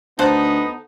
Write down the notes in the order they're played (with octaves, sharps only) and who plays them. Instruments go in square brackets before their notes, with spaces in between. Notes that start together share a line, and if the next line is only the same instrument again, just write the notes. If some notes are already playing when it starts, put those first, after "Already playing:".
[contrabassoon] D2 [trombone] B3 [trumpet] D#4 [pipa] A4 C5 F#5